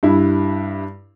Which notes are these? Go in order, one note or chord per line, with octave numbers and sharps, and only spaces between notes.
G2 E4